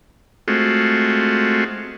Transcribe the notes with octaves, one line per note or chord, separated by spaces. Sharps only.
G#3 A3 C4 F4 F#4